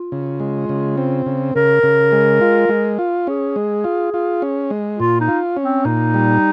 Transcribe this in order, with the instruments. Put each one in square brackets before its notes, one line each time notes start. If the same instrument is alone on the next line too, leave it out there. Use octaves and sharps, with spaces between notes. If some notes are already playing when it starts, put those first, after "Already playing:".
Already playing: [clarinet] F4
[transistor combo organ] C#3
G#3
C#3
C4
C#3
[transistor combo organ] C#3 [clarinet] A#4
[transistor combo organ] C#3
G#3
F4
G#3
F4
[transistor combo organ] C#4 [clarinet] G#4
[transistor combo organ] G#3
F4
F4
C#4
G#3
[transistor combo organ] A#2 [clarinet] F4
[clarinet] D#4
[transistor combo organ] F4
C#4
[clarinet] C4
[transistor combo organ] A#2 [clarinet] D#4
[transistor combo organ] G3